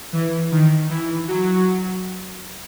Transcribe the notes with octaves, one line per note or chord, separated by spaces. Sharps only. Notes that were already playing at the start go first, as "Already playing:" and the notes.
E3
D#3
E3
F#3